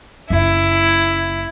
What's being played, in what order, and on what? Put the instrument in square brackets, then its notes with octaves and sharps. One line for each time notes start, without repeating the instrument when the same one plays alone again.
[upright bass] F#1 A#3 [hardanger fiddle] E4